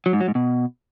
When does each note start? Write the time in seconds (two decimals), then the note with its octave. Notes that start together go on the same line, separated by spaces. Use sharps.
0.06 F#3
0.13 G#2
0.21 F#3
0.28 G#2
0.35 B2